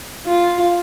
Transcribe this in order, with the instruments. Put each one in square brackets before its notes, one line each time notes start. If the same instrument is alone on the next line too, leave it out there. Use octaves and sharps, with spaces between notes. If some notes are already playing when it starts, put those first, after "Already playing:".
[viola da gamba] F4